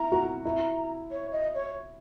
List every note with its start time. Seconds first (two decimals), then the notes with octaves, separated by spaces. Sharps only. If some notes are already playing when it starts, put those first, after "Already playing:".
Already playing: E4 A#5
0.12 F#4
0.44 E4 A#5
1.11 C#5
1.32 D#5
1.55 C#5